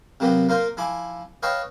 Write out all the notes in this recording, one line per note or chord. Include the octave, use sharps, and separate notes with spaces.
C3 F#3 A#3 B3 G4
A#3 F4 A#4 C5
F3 E4 G#5 D6
B4 C#5 D#5 F5 G5 A5